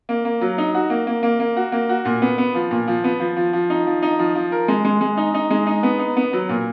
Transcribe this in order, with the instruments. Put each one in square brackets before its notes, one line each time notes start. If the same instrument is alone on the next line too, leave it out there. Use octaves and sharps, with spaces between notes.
[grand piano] A#3
A#3
F#3
D#4
F#4
A#3
A#3
A#3
A#3
F#4
A#3
F#4
A#2
B3
B3
F3
A#2
F3
B3
F3
F3
F3
D#4
F3
D#4
F3
F3
A#4
G#3
G#3
G#3
D#4
D#4
G#3
D#4
B3
D#4
B3
F#3
A#2